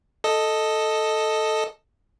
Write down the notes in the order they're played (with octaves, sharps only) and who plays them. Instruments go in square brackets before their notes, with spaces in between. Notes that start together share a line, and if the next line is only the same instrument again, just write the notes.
[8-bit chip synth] A4 D#5